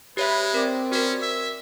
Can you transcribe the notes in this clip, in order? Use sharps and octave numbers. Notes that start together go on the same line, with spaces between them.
G#3 G4 B4 C#5 E5
C4 A#4 D5
C#4 F#4 A#4
E5